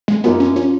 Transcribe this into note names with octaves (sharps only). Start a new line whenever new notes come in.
G#3
F#2 F3 A#3 B3 D#4
C#4
F3 C#4